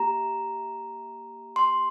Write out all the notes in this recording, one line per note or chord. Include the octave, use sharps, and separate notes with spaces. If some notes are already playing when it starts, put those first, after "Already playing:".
Already playing: A#3 G4 A#5
C6